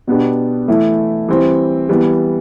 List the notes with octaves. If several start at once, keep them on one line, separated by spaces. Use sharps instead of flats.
B2 B3 D4 G4
E3 A3 E4
E3 G3 C4
E3 G3 B3